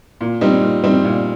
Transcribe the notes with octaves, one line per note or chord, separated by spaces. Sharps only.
A#2
G3 C4 D#4
A#2
G3 C4 D#4
A#2